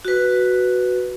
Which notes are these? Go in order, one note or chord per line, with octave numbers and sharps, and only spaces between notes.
F#4 B4